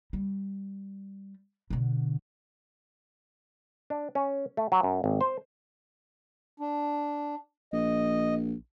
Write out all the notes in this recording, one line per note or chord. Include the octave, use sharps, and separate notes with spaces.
G3
B2 D3
D4
C#4
A3
F#3
F#2
G#1
C5
D4
A#1 D#5